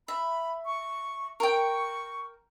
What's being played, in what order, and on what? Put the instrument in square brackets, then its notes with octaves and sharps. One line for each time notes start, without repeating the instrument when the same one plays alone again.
[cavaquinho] E5 [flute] B5
[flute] C#6
[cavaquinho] A#4 G5 [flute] C#6